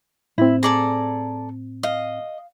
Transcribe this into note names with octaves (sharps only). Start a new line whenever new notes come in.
A2 C4 E4
G#4 A4 D5 A#5
D#5 F5